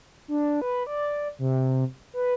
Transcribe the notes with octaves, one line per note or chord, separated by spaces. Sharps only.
D4
B4
D5
C3
B4